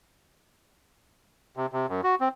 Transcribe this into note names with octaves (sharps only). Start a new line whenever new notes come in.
C3
C3
F#2
F#4
C4